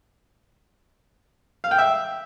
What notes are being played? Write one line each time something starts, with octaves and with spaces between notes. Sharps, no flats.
F5
G5
E5